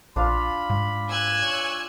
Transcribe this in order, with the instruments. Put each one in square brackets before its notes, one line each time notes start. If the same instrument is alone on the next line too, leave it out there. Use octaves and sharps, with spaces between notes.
[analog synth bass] A#1 [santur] D4 F4 F5 [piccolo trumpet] B5
[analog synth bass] G#2
[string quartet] G#5 E6 F#6
[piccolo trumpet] C#5